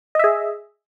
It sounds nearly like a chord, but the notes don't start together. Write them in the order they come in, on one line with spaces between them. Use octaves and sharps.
D#5 E5 G#4